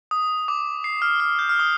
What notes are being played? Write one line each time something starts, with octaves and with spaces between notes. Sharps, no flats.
D#6
D6
C7
F6
F6
G6
F6
D#6